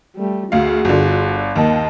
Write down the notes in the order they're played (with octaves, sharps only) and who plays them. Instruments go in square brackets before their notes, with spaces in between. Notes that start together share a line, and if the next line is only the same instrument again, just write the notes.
[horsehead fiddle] G3 A3
[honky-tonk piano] D2 F5 [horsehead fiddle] F#4 G#4
[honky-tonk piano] G1 D3
[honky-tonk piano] D#2 D#3 [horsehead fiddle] D#5 A5